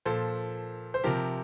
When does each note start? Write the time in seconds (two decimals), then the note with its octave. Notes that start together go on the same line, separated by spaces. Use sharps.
0.05 A#2 F3 A4 C5
0.94 C5
1.04 C3 F3 G4 A#4